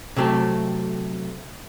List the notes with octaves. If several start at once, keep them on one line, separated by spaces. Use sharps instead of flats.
C3 F#3 A3 C4